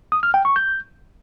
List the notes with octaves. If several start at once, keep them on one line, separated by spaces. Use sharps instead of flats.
D#6
F6
G5
C#6
G6